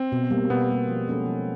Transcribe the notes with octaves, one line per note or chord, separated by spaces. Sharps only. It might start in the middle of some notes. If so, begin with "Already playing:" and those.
Already playing: C4
B2
G3 A#3
B2 B3
G3 A#3
F3
G#3 C#4 F#4 A4
F3